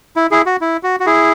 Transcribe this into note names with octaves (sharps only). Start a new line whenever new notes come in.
E4
E4 G#4
F#4
E4
F#4
F#4
E4 G#4